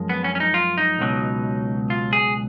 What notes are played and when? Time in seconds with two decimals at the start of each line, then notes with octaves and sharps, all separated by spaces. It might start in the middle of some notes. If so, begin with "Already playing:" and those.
Already playing: F#2 F3 G#3
0.09 B3
0.24 C#4
0.35 C#4
0.40 D#4
0.54 F4
0.78 D#4
0.99 C#2 B2 F#3
1.90 F4
2.13 G#4